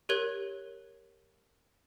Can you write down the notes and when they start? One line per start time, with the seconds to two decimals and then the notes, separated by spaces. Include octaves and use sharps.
0.09 G4 A#4 C#5 F#6 G#6 G7